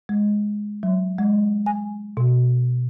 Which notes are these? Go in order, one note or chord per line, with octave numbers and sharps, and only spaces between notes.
G#3
F#3
G#3
G#5
B2